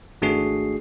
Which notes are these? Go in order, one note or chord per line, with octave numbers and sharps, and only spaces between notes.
G#1 A3 D4 F#4 G#4 C7